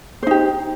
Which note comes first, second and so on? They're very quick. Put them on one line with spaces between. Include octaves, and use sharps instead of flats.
C5 D#4 G4